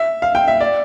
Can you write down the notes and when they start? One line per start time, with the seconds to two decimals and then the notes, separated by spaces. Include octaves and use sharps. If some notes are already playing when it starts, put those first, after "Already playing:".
Already playing: E5
0.22 F5
0.35 G5
0.48 E5
0.61 D5